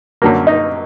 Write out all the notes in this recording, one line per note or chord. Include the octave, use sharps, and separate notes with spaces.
F#2 D3 F#3 A#3
D#4